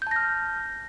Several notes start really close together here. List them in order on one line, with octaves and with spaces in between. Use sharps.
G6 A5 A#6 F6